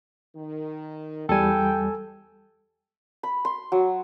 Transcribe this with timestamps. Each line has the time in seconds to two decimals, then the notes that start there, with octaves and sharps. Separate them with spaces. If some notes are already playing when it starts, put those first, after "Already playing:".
0.36 D#3
1.29 E2 G3 A4 G5 G#5
3.23 B5
3.45 C6
3.72 F#3